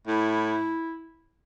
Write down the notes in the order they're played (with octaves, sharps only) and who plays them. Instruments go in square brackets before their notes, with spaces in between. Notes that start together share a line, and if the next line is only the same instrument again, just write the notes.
[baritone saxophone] A2 [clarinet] E4